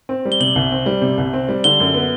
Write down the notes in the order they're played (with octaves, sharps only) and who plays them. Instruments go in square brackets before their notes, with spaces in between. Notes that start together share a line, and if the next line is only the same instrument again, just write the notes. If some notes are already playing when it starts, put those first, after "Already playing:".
[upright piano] C4
G3
[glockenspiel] G7
[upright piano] C3 [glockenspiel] F#7
[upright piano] C2
C4
G3
C3
C2
C4
G3
[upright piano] D3 [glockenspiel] G7
[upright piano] F#2
B3